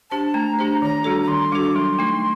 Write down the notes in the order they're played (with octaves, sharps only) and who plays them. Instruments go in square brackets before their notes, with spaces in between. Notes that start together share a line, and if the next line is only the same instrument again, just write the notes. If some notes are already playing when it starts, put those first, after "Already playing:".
[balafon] D4 G4 C5 [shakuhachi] A5
[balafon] A3 [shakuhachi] A#5
[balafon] D4 G4 C5
[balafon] D#3 [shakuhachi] A#5
[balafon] G3 D4 F#4 A4
[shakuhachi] A#5
[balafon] D#3 [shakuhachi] C6
[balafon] G3 D4 F#4 A4 [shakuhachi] D6
[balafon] F#3 [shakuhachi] C6
[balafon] A3 D#4